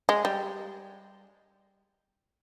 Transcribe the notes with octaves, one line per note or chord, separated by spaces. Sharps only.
G#3
G3